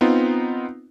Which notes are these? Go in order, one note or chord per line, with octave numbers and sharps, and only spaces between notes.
B3 C4 D#4 F4